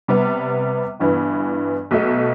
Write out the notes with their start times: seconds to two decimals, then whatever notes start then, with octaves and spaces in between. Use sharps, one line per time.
0.08 C3 G3 B3
1.00 G1 G2 E3 B3
1.91 B1 B2 A3